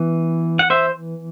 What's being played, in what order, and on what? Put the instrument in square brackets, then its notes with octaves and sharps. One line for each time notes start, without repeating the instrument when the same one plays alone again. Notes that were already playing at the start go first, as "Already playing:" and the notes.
Already playing: [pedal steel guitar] E3 B3
F#5
C5 E5